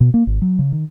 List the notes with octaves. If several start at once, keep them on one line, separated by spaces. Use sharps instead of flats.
B2
A#3
G#1
F#3
C#3
D#3